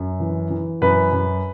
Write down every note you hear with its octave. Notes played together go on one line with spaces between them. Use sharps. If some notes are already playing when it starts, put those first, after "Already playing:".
Already playing: F#2
E3
E3
F#2 B4
F#2